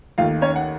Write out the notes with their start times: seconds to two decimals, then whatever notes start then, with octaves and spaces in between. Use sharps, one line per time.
0.18 D#2 D#3 A3 F4 F5
0.41 C#4 C#5
0.56 F#5